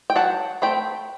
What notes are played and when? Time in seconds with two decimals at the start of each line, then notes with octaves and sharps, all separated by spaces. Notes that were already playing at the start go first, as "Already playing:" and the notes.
0.10 G5
0.16 F#3 F#5 A5
0.62 A3 C4 G5 B5